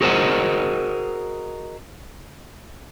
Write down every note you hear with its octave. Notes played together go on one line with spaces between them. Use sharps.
F#4 G#4 A#4 C5 D#5 F#5